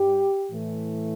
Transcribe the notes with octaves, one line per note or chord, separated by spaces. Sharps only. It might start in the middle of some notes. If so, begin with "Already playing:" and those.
Already playing: G2 G3 G4
A2 E3 A3